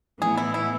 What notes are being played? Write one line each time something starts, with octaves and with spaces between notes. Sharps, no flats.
A2 E3 B3 G#4
E4
E4